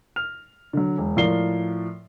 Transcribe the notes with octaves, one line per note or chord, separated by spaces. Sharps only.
F6 F7
D3 F#3
E1
A2 F3 A#4 D5 C7 G7